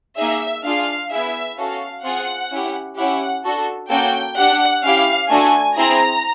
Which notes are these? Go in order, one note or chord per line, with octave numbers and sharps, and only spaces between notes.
A#3 D#4 G#4 E5
D4 F4 G#4 F5
B3 E4 G#4 E5
C#4 F#4 A4 F5
C4 F4 G#4 F#5
C#4 E4 G4
C#4 E4 G4 F#5
D4 F#4 A4
A#3 C#4 F#4 A4 G5
D4 G4 F#5
C#4 E4 G4 F5
A3 D4 F#4 A4 G#5
C4 E4 G#4 A#5